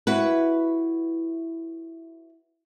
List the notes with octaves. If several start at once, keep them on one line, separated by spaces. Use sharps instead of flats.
E4 F#4 B4